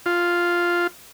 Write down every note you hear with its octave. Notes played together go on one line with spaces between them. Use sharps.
F4